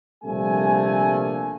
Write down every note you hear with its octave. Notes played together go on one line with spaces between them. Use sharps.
A#1 C3 G3 A3 A#3 G#5